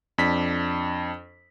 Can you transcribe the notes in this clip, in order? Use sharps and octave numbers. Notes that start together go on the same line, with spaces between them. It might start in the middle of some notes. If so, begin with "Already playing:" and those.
F2 D4 B6